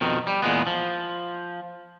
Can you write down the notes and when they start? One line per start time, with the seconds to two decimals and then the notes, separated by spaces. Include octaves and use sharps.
0.01 F2 B2 D#3
0.27 G3
0.42 E2 A#2 G#3 B3
0.67 F3